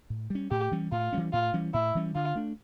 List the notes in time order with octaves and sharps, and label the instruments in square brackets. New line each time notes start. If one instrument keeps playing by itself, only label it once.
[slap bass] A2
G3 C#4
[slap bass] A2 [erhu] G4
[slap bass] E3 G3 C#4
[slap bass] A2 [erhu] F4
[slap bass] E3 G3 C#4
[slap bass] A2 [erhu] F4
[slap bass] E3 G3 C#4
[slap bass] A2 [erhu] E4
[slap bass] E3 G3 C#4
[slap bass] D3 [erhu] F4
[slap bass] A3 D4